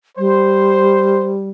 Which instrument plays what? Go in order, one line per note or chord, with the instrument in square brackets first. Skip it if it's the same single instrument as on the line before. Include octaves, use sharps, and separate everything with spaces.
[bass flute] G3 [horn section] C5